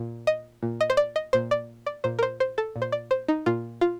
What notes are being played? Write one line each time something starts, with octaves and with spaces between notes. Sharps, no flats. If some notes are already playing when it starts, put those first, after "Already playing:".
Already playing: A#2
D#5
A#2
D#5
C5
D5
D#5
A#2 C5
D5
D5
A#2 C5
A#4
C5
C5
A4
A#2
C5
D5
C5
D#4
A#2 F4
F4